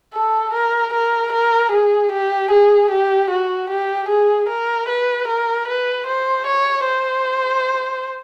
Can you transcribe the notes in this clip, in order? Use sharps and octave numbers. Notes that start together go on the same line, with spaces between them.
A4
A#4
A#4
A#4
G#4
G4
G#4
G4
F#4
G4
G#4
A#4
B4
A#4
B4
C5
C#5
C5